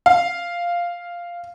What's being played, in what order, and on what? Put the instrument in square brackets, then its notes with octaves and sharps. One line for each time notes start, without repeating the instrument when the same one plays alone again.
[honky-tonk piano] F5